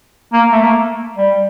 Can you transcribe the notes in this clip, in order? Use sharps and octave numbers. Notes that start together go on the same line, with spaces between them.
A#3
A3
A#3
G3